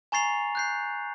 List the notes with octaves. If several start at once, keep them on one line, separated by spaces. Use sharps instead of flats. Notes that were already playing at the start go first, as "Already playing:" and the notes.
G#5 A#5 C#6 A6 C7 F7
F#6 G6 C7